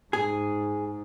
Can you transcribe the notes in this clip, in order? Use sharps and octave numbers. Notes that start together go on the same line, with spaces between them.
G#2 G#4